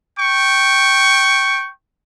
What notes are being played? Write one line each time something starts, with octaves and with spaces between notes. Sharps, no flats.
G5 C#6